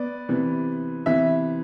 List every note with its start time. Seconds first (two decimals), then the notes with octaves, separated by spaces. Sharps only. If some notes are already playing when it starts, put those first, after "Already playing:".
Already playing: B3 D5
0.29 C3 E3 B3
1.06 C3 E3 B3 E5